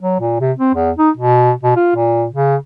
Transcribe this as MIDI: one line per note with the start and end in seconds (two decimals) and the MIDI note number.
0.02 0.17 54
0.20 0.40 46
0.40 0.52 48
0.58 0.74 60
0.75 0.91 40
0.98 1.10 63
1.17 1.52 47
1.63 1.76 47
1.76 1.94 65
1.96 2.26 46
2.31 2.56 49